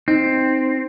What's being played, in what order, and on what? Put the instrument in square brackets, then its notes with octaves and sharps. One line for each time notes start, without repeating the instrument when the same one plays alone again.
[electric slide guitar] C4 [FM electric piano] D#4